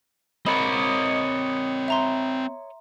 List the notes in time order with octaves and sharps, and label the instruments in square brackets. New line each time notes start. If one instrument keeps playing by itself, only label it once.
[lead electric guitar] C4 A#4 [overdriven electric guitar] C#5 D#5 [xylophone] B5
[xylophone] E5 A#5 C6